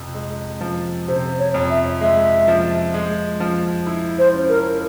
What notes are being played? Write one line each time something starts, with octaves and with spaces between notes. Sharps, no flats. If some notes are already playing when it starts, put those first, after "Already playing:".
Already playing: F2 C3
G#3
F3
C3 C5
C#5
F2
E5
G#3 E5
F3
G#3
F3
E4
C5
C#4
A#4